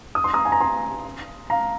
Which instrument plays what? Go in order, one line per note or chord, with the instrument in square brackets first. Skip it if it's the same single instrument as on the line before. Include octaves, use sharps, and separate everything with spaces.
[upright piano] D#6
C6
A#5 D#6
G#5
A#5
G#5 C6
F5 A#5